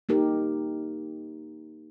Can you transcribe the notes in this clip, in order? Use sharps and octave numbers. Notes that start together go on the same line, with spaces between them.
A#3 D#4 G4 A#4